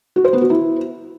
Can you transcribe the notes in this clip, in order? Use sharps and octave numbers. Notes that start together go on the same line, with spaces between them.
F#4
C5
B3
F#4
E4